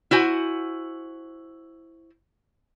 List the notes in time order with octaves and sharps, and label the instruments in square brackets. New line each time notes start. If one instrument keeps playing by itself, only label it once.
[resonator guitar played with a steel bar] E4 F#4 C5 G#5